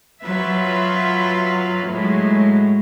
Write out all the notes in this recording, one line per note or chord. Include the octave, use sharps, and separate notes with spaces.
F#3 F4 B4 E5
A2 F#3 G#3